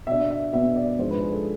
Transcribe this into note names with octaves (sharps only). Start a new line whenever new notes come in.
B2 B3 D4 E5
E5
B2 B3 D4 E5
D5
G#2 F3 G#3 D4 C5
B4
G#4
A4